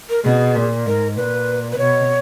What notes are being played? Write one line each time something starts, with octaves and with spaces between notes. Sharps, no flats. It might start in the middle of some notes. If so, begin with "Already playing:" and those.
A#4
B2 G#4
A#2
G#2 A#4
A#2 B4
B4
B2 C#5